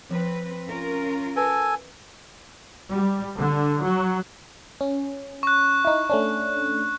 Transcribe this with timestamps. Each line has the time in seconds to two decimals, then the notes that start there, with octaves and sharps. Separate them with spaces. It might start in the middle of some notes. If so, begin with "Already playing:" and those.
0.11 F3 C4 B4
0.67 C#4 F4 A#4
1.36 A4 B4 G#5
2.91 G3
3.37 D3
3.83 F#3
4.81 C#4
5.43 C#6 F#6
5.85 D#4 E4
6.10 A3 C#4 D4